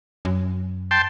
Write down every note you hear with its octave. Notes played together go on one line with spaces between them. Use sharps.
F#2
G5 A5 C6